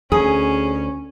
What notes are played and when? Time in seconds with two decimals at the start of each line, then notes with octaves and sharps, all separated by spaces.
0.12 D2 C#4 G#4